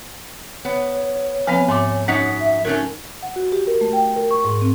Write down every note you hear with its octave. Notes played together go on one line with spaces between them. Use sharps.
B3 C#5
F3 B3 C4 B4 F5 G#5
G#2 A3 C6 D6
F#2 D#4 F#5 B6
E5
F#3 A3 C#4 D#4 A#4
F#5
F#4
G4
A#4
A3
G5
A#4
C#6
G#2
C4